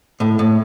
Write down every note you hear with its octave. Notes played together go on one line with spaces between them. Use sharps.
A2
A2